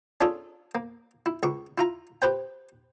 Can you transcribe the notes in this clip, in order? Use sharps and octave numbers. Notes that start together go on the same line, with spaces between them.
C#4 D4 F4 G#4 A4
A#3
E4
C#2 C#6 D6
E4 F4 A#5
G4 B4 C5 G5